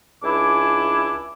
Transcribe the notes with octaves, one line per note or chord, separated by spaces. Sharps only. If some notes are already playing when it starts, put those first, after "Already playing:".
C#2 D4 E4 G#5 D6